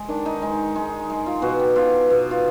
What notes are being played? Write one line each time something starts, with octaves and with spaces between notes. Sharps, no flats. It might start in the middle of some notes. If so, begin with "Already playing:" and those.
Already playing: G#3
D#3 D4
D#4
G#3 D#4
G#3
G#3
F4
B2 F#4
G4
B2 F4
B2
F4